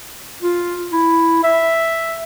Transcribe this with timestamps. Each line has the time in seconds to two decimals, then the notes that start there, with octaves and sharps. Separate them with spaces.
0.42 F4
0.92 E4
1.43 E5